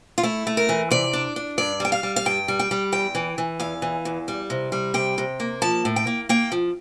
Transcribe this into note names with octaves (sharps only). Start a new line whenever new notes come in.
F4
A3 E4
A3
A#4
E3
C3 D5
D4
D4
G2 D5
G3 G5
F5
G3
F5
G2 G5
G3
G5
G3
E2 G5
E3
E3
E2 F5
E3
E2
G3
C3
G3
C3 G5
C3
A#3
F3 A5
A2
G5
A#3
A#3 G5
F3